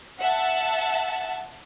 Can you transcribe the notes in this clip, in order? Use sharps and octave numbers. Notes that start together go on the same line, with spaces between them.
E5 F#5 A5